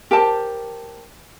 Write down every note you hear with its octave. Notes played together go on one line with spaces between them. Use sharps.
G4 A#4 C5 A5